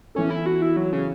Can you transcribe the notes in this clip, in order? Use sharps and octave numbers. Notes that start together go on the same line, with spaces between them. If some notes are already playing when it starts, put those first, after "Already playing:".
E3 B3 C#4 A4
E4
F#4
E4
F#3
C#3